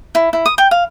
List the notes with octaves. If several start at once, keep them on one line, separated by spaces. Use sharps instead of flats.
E4
E4
D#6
G5
F5